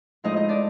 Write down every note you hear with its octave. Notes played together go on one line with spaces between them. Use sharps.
A2 F3 G#3 D#4 D#5
D#4 D#5
D4 D5